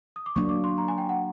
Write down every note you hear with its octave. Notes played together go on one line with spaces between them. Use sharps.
D#6
D6
F#3 A#3 D4 C#6
D6
C6
A#5
G#5
G5
F#5